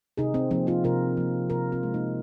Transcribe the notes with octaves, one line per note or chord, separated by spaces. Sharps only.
C3 D#4 G#4
C4
F3 A#3 C4
C4 F4
C3 F4 A#4
F3 A#3
C3 F4 A#4
C4 F4
G#3
A#3 D#4